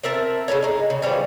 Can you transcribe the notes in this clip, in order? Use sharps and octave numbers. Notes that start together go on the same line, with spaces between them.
C4 A#4 E5 A5
C#3 A3 A#3 C#4
G#3 D#4
C#3
E3 F3 G3 C#4